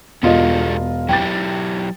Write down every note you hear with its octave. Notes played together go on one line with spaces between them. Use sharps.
E1 B3 F4 G4 A4 D#5
F#3 E4 G4 G5 A6